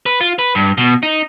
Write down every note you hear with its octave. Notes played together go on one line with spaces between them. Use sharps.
B4
F4
B4
G2
B2
D#4